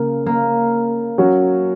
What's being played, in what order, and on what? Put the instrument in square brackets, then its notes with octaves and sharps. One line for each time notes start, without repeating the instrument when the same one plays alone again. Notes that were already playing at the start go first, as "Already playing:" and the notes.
Already playing: [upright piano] C#3 [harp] A#3
[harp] A#3
[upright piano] F#3 C#4 F#4